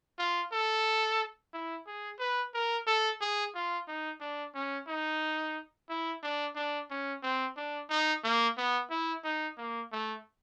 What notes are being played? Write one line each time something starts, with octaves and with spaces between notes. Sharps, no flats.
F4
A4
E4
G#4
B4
A#4
A4
G#4
F4
D#4
D4
C#4
D#4
E4
D4
D4
C#4
C4
D4
D#4
A#3
B3
E4
D#4
A#3
A3